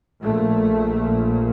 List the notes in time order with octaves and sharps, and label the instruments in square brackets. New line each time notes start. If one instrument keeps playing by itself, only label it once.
[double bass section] A#1 A#2 A3